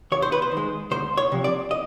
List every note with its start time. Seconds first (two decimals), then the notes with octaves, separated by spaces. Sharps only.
0.12 D#2 C#5
0.22 C5
0.32 B4
0.42 C5
0.52 D#3
0.57 G#3
0.91 D2 C5
1.17 C#5
1.32 C3 F3
1.44 D5
1.71 D#5